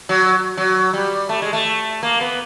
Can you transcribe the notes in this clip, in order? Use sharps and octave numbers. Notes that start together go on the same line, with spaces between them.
F#3
F#3
G3
A3
G#3
A3
A#3
B3